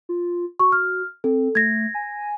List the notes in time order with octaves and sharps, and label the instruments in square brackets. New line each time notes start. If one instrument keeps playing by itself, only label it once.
[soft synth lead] F4
[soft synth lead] F#4 [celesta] C#6
[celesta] F6
[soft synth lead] C4 [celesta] A4
[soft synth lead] A3 [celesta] G#6 A#6
[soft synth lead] G#5